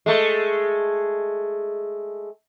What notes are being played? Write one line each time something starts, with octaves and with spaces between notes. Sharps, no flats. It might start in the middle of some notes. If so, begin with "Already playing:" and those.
G#3 A3